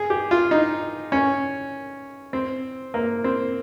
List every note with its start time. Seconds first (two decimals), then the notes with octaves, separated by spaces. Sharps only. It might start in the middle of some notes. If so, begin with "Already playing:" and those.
Already playing: G#4
0.10 G4
0.31 F4
0.51 D#4
1.12 C#4
2.33 C4
2.94 A#3
3.24 C4